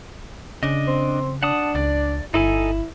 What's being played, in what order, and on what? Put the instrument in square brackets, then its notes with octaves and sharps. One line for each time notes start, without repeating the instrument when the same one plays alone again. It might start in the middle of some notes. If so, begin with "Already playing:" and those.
[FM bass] C#3 [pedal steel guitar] D4 D#5
[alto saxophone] C4
[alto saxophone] D4 [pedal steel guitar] F#5 A5 D#6
[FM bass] C#2 [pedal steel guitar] D5
[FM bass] G1 [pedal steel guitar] D#4 A4 G#5 [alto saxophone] E4